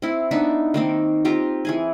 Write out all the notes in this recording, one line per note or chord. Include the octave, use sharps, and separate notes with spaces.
C4 E4
B3 D4 D#4 E5
D#3 A#3 C4
C4 F4 G4 A#5
E3 G#4 G#5